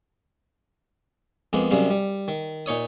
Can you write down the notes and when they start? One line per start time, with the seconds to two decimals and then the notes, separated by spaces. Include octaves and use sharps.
1.53 F2 G#3 A#3 B3
1.71 F#2 C3 G3 G#3 F5
1.90 G3
2.28 D#3
2.66 A#2 D#4 C#5 D#6